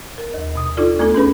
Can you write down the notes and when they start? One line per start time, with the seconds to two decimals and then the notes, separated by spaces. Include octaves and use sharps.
0.18 A#4
0.34 D#2
0.55 B2 D#6
0.77 D4 D#4 F4 A4 D5
0.99 D2 A3 B3 D4 D#4 A4
1.14 C#4 G#4 B4 B5